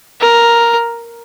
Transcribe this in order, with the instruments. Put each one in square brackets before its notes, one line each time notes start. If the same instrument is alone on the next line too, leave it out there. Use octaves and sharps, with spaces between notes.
[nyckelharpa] A#4